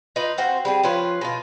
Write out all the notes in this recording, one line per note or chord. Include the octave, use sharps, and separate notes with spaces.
D#4 F4 B4
C4 F#4 C5 F5
G3 C4 G#4
F3 C#4 F4 B4
B2 F4